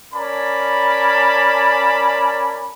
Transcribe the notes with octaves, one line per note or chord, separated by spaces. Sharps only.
C#4 A#4 D5 G#5 A5 B5